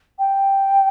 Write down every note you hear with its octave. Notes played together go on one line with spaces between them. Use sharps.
G5